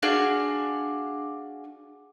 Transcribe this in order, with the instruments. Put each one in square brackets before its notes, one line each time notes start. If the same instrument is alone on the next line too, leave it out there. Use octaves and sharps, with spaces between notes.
[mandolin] D4 F#4 G#4 F5